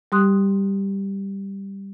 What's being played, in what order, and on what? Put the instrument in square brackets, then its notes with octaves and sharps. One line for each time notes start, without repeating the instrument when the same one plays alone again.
[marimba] G3 G4 C6 D#6 F#6